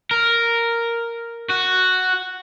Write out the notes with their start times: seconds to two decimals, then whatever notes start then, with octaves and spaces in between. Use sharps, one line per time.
0.11 A#4
1.50 F#4